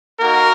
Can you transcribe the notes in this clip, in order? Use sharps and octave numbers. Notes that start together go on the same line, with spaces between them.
A#3 D#4 F#4 A#4